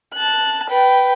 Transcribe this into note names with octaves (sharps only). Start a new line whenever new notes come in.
A5 F#6
B4 G5